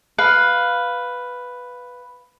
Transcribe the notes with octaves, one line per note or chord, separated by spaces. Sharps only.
B4 F5